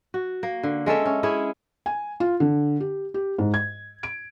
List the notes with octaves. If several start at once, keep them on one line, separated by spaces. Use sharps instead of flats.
F#4
A#3
D3
G#3 C#4 A4 E5
C#4
C#4 E4 G#4
G#5
F4
D3
G4
G4
G#2
G#6
D7